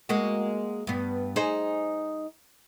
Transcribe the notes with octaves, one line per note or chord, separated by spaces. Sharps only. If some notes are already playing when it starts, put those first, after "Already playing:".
G#3 A#3 F#4
G2 B3
D#4 G#4 C5